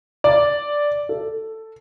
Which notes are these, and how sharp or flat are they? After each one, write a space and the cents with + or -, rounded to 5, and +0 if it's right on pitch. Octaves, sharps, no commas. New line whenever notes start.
D5 -5
A4 +10